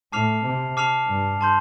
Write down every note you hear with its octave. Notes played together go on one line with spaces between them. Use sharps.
A2 A5 D6 F6 C7 F7
C3
A5 D6 F6 C7 F7
G2
A5 C6 G6